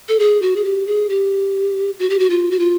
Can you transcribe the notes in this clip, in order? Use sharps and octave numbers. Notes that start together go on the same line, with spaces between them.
A4
G#4
F#4
G#4
G4
G#4
G4
F#4
G4
F#4
F4
F#4
F4